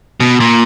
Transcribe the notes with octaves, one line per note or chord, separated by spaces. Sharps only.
B2
A#2